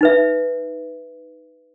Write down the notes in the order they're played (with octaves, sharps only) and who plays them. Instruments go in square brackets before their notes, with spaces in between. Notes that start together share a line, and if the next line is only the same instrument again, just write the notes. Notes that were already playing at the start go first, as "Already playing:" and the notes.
[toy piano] D#4 B4 E5